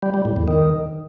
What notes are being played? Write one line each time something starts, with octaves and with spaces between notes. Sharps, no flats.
G3
G3
A2
E2
D#3